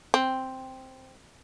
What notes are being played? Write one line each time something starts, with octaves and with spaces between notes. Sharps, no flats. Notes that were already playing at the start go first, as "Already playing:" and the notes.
C4